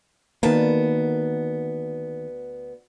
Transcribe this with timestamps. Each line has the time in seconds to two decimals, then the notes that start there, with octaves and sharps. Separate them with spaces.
0.43 D2 D#3 A#3 B3 A5